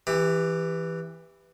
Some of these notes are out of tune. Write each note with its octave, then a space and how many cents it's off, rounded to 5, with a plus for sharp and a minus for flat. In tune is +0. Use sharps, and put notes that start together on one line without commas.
E3 +0 G4 +20